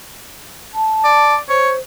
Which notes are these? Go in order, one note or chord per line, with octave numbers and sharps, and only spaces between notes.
A5
D5
C5 C#5